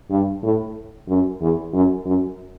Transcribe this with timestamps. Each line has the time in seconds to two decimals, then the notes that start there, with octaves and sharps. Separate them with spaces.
0.10 G2
0.43 A2
1.08 F#2
1.41 E2
1.73 F#2
2.06 F#2